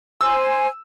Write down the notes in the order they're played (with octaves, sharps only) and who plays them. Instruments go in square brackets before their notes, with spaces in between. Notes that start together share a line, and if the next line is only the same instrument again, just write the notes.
[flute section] C5 G#5 [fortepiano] E6